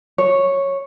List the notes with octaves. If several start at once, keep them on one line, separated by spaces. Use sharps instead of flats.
C#5